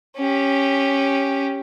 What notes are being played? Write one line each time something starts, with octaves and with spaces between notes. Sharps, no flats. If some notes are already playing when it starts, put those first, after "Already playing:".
C#4 G4